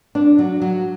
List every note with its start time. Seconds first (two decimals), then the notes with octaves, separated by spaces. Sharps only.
0.15 D4
0.39 F#3
0.62 F#3